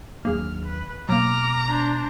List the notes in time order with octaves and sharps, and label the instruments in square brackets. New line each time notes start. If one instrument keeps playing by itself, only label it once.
[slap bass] D#2 F#3 D4 [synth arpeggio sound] A#3 G#4 [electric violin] F6
[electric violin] B4
[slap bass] B2 G#3 [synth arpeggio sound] F#3 A#3 [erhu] A#5 [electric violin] D6 F6
[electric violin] D4 C5